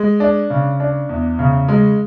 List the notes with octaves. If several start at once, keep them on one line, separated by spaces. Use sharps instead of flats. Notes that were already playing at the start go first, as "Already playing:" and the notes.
Already playing: G#3
D4
C#3
D4
E2
C#3
G#3